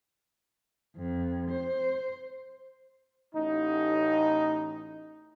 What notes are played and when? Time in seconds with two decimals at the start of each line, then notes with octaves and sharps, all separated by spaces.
0.96 F2
1.50 C5
3.34 A1 D#4